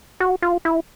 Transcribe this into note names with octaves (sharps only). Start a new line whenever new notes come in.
F#4
F4
E4